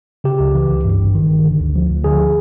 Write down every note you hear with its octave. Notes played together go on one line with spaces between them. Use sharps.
C#3 G4
C#2
E3
C#2
G2
G#1
D#3
G#1
D3
D2
F3
D2
D3 G#4